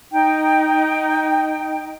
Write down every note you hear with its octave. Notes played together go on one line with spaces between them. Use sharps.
D#4 G5